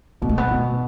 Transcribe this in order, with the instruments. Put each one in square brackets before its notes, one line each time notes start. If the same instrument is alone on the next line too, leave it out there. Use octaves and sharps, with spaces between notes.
[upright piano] B2 [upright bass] B3
[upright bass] A3
B3
[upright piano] B2